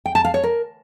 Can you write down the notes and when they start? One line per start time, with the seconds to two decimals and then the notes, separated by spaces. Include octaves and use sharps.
0.06 G5
0.15 A5
0.25 F5
0.34 C#5
0.43 A#4